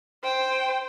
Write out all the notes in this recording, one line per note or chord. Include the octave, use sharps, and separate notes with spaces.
C5 G5